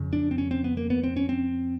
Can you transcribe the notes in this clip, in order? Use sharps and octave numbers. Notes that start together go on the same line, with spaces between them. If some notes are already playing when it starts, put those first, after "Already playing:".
Already playing: F2 C#3
D4
C4
C#4
C4
B3
A#3
B3
C4
C#4
C4